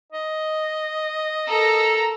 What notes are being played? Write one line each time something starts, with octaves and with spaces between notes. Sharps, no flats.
D#5
A4 A#4 A#5 E6